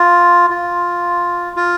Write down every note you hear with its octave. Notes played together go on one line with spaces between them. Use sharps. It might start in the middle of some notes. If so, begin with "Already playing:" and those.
Already playing: F4
F4
F4